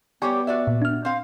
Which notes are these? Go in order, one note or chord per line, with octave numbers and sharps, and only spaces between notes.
G3 B3 G4 C#5 G5 G#5 C#6
F#4 D5 E5
A#2
D4 F6
C4 F5